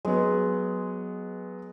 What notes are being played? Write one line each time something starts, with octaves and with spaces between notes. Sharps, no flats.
F#3 G#3 B3